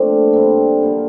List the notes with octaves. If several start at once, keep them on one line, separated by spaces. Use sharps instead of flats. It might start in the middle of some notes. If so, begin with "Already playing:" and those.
Already playing: A#2 F3 A3 C4 D4
G2 D3 G3 A#3 C4
D3 F3 A#3